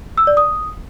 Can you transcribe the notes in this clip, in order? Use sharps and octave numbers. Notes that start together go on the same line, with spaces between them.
E6
D5
D#6